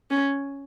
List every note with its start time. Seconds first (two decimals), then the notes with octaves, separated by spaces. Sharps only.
0.11 C#4